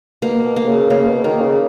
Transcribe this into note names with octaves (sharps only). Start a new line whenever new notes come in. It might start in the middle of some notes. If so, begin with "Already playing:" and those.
B2 A#3
B2
A#3
C#3
C#3 A#3
B2
D#3 A#3
C#3